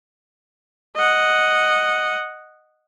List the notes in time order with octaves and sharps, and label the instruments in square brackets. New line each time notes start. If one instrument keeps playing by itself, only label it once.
[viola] D#5 F#5